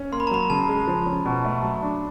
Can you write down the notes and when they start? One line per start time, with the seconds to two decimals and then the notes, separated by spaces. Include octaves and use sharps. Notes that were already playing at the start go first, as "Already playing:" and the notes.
Already playing: C#4
0.12 A#3 C6
0.20 B5
0.27 A#5
0.31 F#3 B5
0.50 C#3 A5
0.69 G#3
0.87 F3
1.06 C#4
1.25 B2
1.44 A3
1.63 F#3
1.82 D4